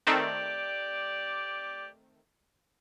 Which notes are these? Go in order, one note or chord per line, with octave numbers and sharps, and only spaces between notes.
D#3 A3 C4 G4 D5